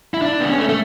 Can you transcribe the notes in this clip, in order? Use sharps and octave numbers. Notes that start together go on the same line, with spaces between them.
E4
D4
B3
C#4
A3
A3